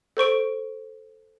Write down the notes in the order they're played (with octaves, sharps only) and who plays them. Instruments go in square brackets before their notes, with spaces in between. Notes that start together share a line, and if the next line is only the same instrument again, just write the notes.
[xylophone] A4 C5 C#6 D7